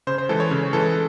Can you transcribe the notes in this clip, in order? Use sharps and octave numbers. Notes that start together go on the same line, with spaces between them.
C#3 C5
C5
E3 G#3 A4
C#5
C#3
E3 G#3 A4